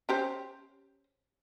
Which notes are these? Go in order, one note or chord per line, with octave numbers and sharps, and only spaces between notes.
C#4 G4 C5